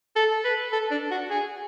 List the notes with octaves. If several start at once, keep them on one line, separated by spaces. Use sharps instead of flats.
A4
B4
A4
D4
F#4
G#4